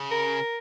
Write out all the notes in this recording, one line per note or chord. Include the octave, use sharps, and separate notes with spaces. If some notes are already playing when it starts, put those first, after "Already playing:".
Already playing: C#3
A#4